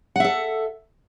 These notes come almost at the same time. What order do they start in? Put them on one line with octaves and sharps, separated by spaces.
F#5 E5 A4